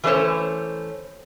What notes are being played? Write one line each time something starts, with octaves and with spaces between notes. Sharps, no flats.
E3 F#3 A3 C#4 C5 C#5